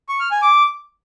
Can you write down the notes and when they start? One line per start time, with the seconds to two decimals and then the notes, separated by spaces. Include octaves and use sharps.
0.09 C#6
0.20 F6
0.31 G#5
0.42 D6